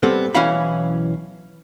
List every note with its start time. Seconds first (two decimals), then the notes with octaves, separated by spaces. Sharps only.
0.03 G3 B3 C4 G4 A4
0.35 B1 E3 C#4 E4 F5 B5